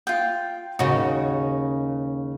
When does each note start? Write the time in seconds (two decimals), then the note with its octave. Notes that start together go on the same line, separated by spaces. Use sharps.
0.07 F4 G5
0.79 D#2 C#3 D#4 F#4